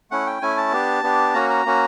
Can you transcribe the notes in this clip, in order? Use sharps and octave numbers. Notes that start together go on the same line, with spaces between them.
A3 C#4 E4 F#5
G5
A3 C#4 E4 G#5
A5
B3 D4 G4
B3 D4 G4
A#3 C#4 F#4 A#5
A#5
A#3 C#4 F#4